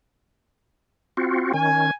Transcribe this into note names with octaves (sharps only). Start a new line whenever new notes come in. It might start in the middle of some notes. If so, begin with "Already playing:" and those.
C4 F4 F#4
D#3 C#4 G#5